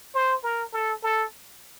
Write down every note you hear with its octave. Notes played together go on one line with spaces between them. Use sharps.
C5
A#4
A4
A4